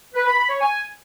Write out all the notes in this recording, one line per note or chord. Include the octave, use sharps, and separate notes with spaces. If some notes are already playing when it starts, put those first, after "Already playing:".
B4
B5
B5
C#5
G#5